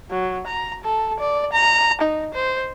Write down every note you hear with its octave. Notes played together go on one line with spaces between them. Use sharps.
F#3
A#5
A4
D5
A#5
D#4
C5